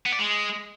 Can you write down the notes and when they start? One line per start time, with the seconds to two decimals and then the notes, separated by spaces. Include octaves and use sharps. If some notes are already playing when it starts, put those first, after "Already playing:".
0.06 B3
0.12 D5
0.19 G#3